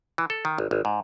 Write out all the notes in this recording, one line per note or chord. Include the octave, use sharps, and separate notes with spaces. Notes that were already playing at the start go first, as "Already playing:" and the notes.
E3
A4
D#3
G#1
G#1
G#2